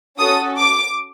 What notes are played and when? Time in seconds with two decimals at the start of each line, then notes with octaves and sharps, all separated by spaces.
0.18 C#4 F#4 A4 D#6
0.59 D6